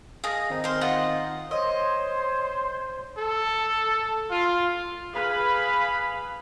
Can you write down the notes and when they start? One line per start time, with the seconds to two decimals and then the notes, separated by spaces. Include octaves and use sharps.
0.24 G#4 D#5 F5 A#6
0.50 D#3 C4 D#4
0.64 C5 F5
0.81 F4 D#5 F#5
1.51 C5 C#5 D#5 C6
3.18 A4
4.31 F4
5.13 G#4 B4 F5 B5